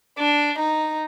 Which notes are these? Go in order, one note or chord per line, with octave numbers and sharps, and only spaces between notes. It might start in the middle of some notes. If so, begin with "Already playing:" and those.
D4
D#4